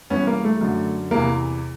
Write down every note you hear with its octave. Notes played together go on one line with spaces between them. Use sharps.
G2 E3 B3 C#4
A#3
A3
F#2 D3
E2 C3 E3 A#3